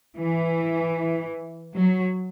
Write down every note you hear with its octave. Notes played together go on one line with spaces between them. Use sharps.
E3
F#3